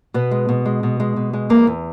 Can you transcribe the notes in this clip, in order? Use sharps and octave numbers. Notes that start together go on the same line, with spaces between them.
B2 B3
G#3
B2
G#3
B2
G#3
B2
G#3
E2 A#3
E2